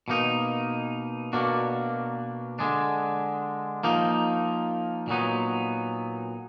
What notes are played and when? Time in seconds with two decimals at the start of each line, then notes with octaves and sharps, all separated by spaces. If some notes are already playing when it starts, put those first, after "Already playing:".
0.08 B2 A#3 D#4
1.33 B2 A#3 D4 F#4
2.59 D3 G#3 D4
3.84 F3 A#3 D#4
5.08 A#2 F#3 B3 D#4